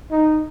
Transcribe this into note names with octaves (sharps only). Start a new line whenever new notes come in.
D#4